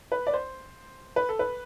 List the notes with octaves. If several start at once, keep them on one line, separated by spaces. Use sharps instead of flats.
B4
D5
C5
B4
A4
B4